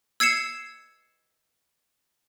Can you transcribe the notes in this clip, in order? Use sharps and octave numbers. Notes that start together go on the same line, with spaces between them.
E6 G#6 C7 C#7 E7